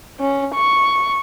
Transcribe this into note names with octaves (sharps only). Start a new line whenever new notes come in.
C#4
C#6